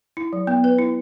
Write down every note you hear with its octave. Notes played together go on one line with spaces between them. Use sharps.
E4
F#3
B3
B4
E4